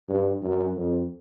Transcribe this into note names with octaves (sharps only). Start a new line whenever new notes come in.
G2
F#2
F2